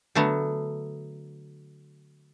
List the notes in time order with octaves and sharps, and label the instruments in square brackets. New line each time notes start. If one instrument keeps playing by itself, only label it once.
[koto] D3 F#3 A3 B3